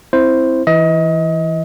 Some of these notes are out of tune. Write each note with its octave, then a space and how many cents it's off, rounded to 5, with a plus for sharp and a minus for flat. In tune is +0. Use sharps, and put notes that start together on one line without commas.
C4 +0 E4 +0 C5 +0
E3 +0 D#5 +30